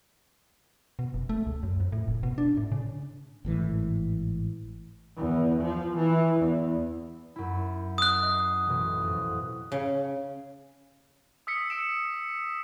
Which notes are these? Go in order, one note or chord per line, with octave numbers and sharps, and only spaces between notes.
B2
F1
A3
C#2
F#2
F2
A2
F1
B2
D4
A2
C#3
G#1 A2 E3
E2
F3
E3
E2
F#2 E4
D#6 F#6
D#5 F#5 C7
A1 B2
F2
C#3
D#6 E6 B6 C#7
E6 D7 E7